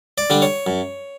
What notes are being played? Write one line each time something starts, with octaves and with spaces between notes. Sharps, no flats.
D5
D3 G3 D4
C#5
F#2